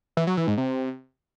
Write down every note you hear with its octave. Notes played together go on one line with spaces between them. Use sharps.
E3
F#3
E3
G#2
C3